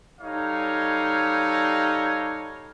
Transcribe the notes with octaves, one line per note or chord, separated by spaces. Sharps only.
G3 D#4 A4 C#5 F5